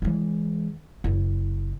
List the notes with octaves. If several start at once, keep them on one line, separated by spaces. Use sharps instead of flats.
E3 G#3
F#1 E4